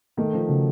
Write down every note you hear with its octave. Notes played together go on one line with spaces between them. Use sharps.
D#3 A3
F3
C#3 F#3